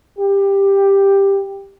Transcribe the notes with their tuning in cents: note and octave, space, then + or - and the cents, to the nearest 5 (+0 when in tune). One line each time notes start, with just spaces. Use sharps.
G4 +10